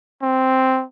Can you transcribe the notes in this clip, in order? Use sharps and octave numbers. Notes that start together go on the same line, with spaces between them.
C4